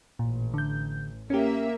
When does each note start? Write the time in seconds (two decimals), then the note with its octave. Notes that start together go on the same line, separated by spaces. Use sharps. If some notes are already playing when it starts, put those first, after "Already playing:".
0.19 A1 A#2
0.54 D3 G6
1.30 A#3 C#4 G4 E5